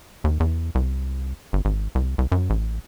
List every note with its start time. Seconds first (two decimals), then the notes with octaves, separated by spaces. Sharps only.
0.24 D#2
0.40 E2
0.75 C2
1.53 G1
1.65 G#1
1.95 C2
2.18 C2
2.32 F#2
2.50 A1